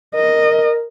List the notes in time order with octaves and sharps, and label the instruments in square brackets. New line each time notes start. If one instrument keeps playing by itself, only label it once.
[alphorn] A#4 [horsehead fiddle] D#5